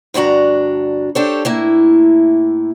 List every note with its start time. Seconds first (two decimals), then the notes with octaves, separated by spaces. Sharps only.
0.14 D2 G2 D4 F#4 A#5
1.15 D4 G4 A4 C5 C#5
1.45 A2 A#3 E4